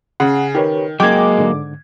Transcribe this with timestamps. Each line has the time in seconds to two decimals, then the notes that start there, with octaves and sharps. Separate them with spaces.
0.20 C#3 F#5
0.55 D#3 G4 B4 C#5
1.00 F#3 G#3 A#3 G5 D6 G#6
1.38 G#2 D3